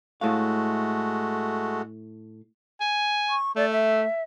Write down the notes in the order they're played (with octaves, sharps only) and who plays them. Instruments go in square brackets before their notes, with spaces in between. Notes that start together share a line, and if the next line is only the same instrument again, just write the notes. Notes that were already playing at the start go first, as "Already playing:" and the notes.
[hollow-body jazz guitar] A2 F5 [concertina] G#3 A3 F#4
[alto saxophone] G#5
[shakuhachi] C#6
[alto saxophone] A3 [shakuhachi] D5
[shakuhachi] E5